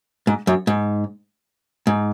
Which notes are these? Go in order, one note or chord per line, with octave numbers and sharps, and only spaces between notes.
G#2
F#2
G#2
G#2